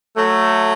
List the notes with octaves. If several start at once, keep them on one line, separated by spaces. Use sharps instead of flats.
F#3 A3